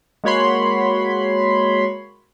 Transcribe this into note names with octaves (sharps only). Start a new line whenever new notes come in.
G#3 A#3 F#4 C#5 B5 C6